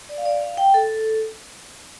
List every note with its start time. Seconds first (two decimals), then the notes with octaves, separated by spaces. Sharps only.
0.09 D5
0.18 F5
0.25 D5
0.41 F5
0.57 G5
0.74 A4